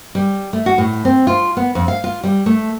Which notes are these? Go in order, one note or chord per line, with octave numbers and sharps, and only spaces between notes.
G3
A3
F#4
A2
C4
F4
B3
F2
F5
F4
G3
A3